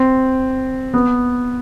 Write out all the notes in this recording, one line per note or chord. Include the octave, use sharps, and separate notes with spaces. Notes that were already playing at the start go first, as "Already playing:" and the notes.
Already playing: C4
B3